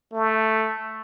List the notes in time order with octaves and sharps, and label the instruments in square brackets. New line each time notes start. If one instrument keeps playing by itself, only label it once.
[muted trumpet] A3